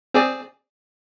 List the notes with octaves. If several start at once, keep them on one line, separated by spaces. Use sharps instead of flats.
C4 G#4 D5